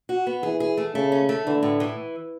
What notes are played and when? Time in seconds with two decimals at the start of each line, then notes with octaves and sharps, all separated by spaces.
0.09 F#4
0.27 B3
0.43 E3 G#4
0.60 G#4
0.77 A3
0.94 C#3 A3
1.12 C#4
1.29 A3
1.45 D3 E3
1.63 A2
1.80 E3